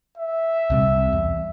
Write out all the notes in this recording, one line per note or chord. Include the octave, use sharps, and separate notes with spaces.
E5
C2 C3 G3
E2